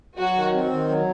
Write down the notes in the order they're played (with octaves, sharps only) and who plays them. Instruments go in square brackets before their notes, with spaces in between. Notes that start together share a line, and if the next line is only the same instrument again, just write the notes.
[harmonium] F#3 [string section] F#4
[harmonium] D#3
C4
D#3
F#3